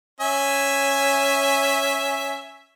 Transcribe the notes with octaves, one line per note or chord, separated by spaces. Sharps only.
C#4 E5 G#5